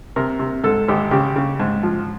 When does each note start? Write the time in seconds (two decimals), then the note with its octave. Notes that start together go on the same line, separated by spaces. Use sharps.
0.16 C3 A#4
0.39 C3
0.64 G#2 A4
0.88 G#1 G4
1.11 C#3 G4
1.36 C#3
1.60 G#2
1.83 F3